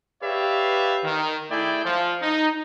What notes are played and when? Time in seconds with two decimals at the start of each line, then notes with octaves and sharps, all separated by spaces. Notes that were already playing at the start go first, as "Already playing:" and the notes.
0.23 G4 B4 C#5 D5 E5 F5
1.04 D#3
1.50 A3 E4 G#4 D5 G5
1.85 F3
2.22 D#4